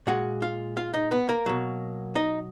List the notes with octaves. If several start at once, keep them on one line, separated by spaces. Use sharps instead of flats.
A#2 G#3 F#4 F#5
F4 F5
F4 F5
D#4 D#5
B3 B4
A#3 A#4
B2 F#3
D#4 D#5